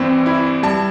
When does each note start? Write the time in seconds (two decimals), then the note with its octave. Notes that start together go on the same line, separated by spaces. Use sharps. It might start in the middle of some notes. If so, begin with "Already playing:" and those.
Already playing: G2 E3 C4
0.26 E4
0.63 G3 A5